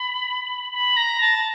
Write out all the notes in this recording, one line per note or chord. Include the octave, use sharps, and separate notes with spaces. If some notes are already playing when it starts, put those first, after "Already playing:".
Already playing: B5
B5
A#5
A5